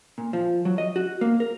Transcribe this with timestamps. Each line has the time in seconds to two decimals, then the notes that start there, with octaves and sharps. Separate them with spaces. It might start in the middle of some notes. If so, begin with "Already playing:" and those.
0.18 A#2
0.33 F3
0.65 F#3
0.78 D#5
0.96 F#4
1.21 A#3
1.40 A#4